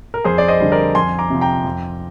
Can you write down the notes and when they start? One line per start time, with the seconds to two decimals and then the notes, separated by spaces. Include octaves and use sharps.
0.14 A#4
0.24 F2 G#4 C5
0.38 D5
0.48 C5 D#5
0.60 D3 G3
0.72 A#4 D5
0.95 F2 G#5 C6
1.19 A#5 D6
1.30 C3 F3
1.41 G5 A#5
1.64 F2